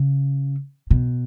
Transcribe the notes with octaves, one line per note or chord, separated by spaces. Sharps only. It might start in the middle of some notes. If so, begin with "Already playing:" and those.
Already playing: C#3
B2